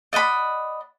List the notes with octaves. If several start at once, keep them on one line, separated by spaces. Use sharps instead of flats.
D5 D#5 F#5 B5